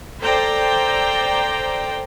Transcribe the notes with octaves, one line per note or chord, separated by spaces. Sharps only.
A4 C5 D5 G5 A#5